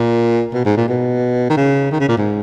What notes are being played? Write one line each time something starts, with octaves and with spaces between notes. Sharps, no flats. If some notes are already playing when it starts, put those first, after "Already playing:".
Already playing: A#2
B2
G#2
A#2
B2
D#3
C#3
D#3
C#3
A#2
G#2